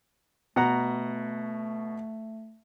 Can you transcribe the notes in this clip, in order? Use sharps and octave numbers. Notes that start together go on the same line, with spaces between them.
B2 A3 F#5 A#5